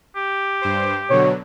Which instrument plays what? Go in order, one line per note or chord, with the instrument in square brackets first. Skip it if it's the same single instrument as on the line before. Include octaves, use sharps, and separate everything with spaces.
[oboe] G4
[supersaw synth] G2 C5
[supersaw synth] B2 D3 F#3 [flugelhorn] C#5